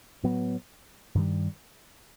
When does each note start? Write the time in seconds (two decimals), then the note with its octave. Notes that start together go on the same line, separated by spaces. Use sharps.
0.23 A2 F#3 B3
1.15 G2 D#3 G3